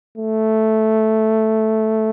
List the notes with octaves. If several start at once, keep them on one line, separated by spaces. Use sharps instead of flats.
A3